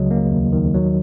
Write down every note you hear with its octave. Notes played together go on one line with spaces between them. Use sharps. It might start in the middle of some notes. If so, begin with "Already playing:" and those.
Already playing: C#2 C#3 F#3 D#5
A#3
D#2
D#3
F#3